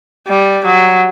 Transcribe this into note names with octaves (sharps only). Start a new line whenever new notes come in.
G3
F#3